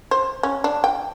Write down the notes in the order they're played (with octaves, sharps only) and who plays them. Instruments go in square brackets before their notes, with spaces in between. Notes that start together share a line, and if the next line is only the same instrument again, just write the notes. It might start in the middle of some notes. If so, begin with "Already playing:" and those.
[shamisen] C5
C#4
D4
G5